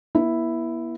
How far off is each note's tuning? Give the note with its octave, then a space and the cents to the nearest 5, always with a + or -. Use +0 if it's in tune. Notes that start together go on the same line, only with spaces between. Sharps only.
B3 -45 E4 +0